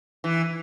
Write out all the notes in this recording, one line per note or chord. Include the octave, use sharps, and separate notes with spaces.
E3